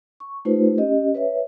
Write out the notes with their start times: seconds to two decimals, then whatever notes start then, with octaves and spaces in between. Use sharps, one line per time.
0.20 C#6
0.45 A3 D#4 F4 G4 B4 C5
0.78 C#4 G4 D#5
1.14 B4 C#5 E5